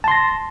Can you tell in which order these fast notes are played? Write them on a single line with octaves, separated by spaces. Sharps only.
A5 C6 A#6